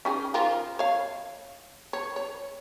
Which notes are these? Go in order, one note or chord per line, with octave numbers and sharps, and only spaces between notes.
C#4 D#4 G#4
F3 F4 A#4
C#5 F5
C#5
C#5